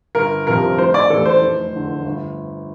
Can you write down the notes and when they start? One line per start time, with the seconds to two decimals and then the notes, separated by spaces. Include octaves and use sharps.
0.15 G1 A#4
0.47 F2 C3 F3 A#4
0.78 F1 C5
0.94 D5
1.10 E2 E3 A3 A4
1.25 C5
1.42 F1
1.73 E2 D3
2.05 G1